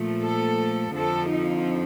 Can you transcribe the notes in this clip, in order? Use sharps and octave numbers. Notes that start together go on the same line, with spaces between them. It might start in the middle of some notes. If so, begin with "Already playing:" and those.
Already playing: A#2 F3 A3
A4
F2 D3 F3 A4
D#4